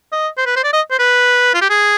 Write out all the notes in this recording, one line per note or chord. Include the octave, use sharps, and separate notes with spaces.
D#5
C5
B4
C5
D5
D#5
C5
B4
F4
G4
G#4